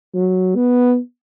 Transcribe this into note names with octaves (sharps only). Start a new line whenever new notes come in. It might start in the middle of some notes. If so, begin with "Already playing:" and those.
F#3
B3